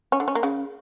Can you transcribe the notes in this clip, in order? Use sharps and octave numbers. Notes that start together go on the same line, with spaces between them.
C#4
D3
C#4
A#3
C#3